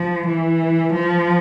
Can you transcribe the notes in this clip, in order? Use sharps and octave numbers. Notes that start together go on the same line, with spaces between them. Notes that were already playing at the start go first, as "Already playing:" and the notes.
Already playing: F3
E3
F3